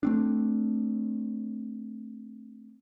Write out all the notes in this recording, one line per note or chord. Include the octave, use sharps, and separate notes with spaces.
A3 C4 D4